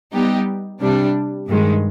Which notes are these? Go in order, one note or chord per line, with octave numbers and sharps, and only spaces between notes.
G3 B3 D#4 G4
C3 G3 D4
G2 D#3 G#3